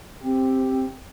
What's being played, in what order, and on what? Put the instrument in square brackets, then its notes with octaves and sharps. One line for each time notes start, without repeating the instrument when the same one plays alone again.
[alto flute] C4 [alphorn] G4